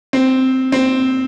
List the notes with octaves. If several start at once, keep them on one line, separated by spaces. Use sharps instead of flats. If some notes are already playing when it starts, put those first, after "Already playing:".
C4
C4